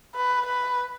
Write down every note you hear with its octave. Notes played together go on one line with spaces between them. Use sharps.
B4
B4